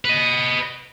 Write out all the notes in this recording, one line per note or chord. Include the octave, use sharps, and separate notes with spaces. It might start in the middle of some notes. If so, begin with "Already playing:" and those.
B4 D#5